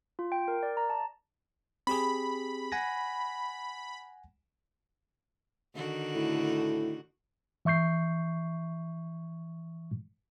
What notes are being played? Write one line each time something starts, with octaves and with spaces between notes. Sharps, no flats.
F4
G5
A#4
D5
A#5
A5
C4 G4 G#4 B5
F#5 G#5 A#6
D3 D#3 F#4
A2
E3 E5 C#6 G6 C7